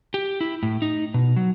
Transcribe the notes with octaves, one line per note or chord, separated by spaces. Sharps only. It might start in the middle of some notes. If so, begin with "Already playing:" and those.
G4
E4
A2
D#4
B2
F#3